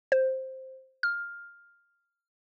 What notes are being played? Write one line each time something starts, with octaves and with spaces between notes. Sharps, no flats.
C5
F6